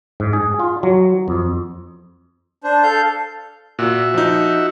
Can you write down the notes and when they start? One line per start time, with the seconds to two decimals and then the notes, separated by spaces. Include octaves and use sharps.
0.20 G#2
0.33 G#4
0.60 F4
0.83 F#3
1.28 F2
2.64 D4 C5
2.83 A4 F5 G6
3.79 A#2 F#4 E5
4.14 F3 D#4